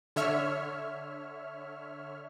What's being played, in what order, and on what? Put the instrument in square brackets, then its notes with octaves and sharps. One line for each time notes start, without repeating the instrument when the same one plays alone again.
[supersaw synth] D3 C#5 E5 F6